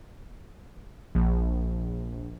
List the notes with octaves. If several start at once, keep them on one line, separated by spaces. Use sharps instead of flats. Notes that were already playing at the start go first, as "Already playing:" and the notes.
A#1